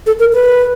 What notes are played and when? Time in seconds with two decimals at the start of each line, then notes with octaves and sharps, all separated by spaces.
0.07 A4
0.19 A#4
0.34 B4